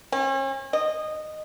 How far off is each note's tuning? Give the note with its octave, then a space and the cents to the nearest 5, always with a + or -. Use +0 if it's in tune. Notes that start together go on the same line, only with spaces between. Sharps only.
C#4 -40
D#5 -10